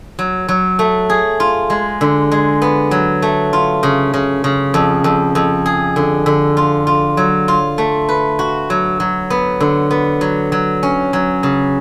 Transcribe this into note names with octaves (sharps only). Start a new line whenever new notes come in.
F#3
F#3
A3
G#4
F4
G#3
D3
G#3
B3
F#3
A3
F4
C#3
C#3
C#3
F2
F2
F2
G#4
D3
D3
F4
F4
F#3
F4
A3
B4
F#4
F#3
F#3
B3
D3
B3
F#3
F#3
C#4
F#3
C#3